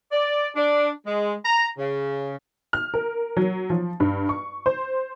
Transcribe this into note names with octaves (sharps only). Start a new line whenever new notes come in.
D5
D4
G#3
A#5
C#3
F6
A#4
F#3
F3
G2
C#6
C5